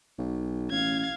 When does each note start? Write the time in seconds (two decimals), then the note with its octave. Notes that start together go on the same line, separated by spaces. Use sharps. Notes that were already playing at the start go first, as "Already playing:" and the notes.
0.19 B1
0.71 A1 F5 G#6